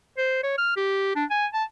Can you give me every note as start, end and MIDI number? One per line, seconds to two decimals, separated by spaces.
0.18 0.42 72
0.44 0.58 73
0.58 0.75 89
0.77 1.16 67
1.16 1.25 62
1.30 1.47 80
1.54 1.64 81